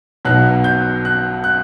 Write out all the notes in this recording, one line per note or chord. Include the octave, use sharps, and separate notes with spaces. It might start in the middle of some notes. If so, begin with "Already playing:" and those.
B1 B2 F#3 F#6
G6
F#6
F#6